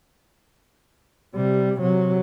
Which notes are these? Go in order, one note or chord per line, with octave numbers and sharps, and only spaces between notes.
C3 G3
C3 F#3